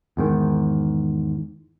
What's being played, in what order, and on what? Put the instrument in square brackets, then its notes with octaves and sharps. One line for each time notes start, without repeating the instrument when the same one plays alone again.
[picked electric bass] E2 G#2 D#3